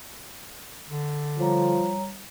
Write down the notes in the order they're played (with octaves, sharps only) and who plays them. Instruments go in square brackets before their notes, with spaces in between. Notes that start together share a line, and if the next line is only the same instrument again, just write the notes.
[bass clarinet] D3
[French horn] F3 [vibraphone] G3 C#5 A#5